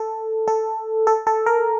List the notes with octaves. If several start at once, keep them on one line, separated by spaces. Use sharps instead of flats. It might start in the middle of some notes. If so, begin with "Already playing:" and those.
Already playing: A4
A4
A4
A4
A#4